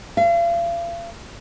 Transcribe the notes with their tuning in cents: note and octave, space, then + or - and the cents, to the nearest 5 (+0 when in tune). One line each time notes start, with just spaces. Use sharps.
F5 -40